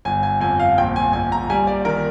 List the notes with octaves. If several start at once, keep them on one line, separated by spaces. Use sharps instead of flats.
G1 G#5
G#5
F2 G#5
F5
A#1 G5
G#5
A#1 G#5
A#5
G3 G#5
D5
D#3 A#4